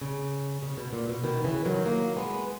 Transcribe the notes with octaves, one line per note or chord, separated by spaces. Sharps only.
C#3
C#3
B2
A#2
B2
B2 D#3
C#3 E3
D#3 F#3
F#3 A#3
G#3 B3